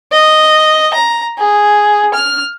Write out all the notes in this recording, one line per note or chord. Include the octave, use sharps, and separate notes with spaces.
D#5
A#5
G#4
F6